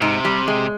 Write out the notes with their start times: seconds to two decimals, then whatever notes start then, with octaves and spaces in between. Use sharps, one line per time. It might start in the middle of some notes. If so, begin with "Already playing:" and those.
0.02 G#2 C3
0.25 G3
0.48 G#3